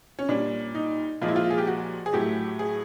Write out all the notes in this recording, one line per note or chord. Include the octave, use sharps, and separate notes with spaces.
C#4
A#2 G3 D4
D#4
A#2 F3 G#3 F4
E4
F4
G#4
G4
F#4
G#4
A2 F#3 A3 G4
G#4